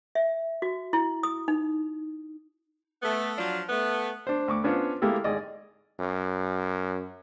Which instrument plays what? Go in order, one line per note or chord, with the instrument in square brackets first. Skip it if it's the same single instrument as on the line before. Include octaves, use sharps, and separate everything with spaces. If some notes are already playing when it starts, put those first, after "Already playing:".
[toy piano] E5
F#4
E4
D#6
D#4
[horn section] A3 B3
F3 F#3 D4 F4
A3 B3
[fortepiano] D4 C5
D2 C#6 D6
B3 C#4 D4 F4 C5 C#5
G#3 A#3 E4 G4 A4
G#1 G#4 D5 D#5
[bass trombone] F#2